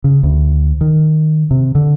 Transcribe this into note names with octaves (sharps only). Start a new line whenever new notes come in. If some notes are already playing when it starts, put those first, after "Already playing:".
C#3
D2
D#3
C3
D3